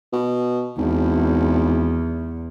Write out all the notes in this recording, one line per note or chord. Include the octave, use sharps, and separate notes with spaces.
B2
G#1 E2